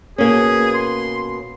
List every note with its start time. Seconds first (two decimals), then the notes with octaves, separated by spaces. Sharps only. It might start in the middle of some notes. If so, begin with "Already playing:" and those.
0.18 B2 A#3 C#4 G#4
0.74 C6